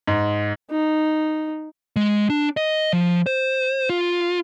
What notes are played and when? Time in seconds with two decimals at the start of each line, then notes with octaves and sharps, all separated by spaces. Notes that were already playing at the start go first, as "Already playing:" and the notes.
0.07 G#2
0.71 D#4
1.96 G#3
2.30 D4
2.57 D#5
2.93 F3
3.26 C5
3.90 F4